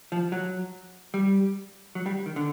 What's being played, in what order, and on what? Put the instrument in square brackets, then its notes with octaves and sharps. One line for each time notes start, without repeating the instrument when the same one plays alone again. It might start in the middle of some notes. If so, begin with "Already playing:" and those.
[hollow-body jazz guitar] F3
F#3
G3
F#3
G3
D#3
D3